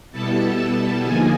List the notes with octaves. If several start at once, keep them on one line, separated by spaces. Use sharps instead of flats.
B2 G3 B3 E4 A4 A5
D3 F3 A#3 D#4 G#4 G#5